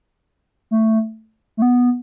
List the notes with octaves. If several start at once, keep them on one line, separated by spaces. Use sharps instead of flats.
A3
A3
B3